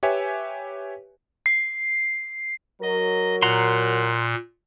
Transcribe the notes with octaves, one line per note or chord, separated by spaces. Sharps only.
G4 B4 C#5 E5 G#5
C7
F#3 A#4 D#5
A#2 F#5 A#5 C6